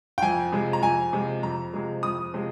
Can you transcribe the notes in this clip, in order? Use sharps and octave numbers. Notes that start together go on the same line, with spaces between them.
G5
F2 G#5
C3 F3 G#3
A#5
F2 G#5
C3 F3 G#3
F2 A#5
C3 F3 G#3
F2 D#6
C3 F3 G#3